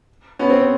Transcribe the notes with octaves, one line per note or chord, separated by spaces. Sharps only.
B3 C#4
C4
C4